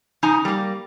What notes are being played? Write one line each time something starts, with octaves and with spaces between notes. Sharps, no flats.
F2 C#3 D#4 G#5 A#5
G3 A#3